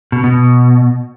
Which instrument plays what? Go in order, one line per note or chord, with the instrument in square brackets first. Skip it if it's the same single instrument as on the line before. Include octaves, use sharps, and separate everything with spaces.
[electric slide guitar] B2
B2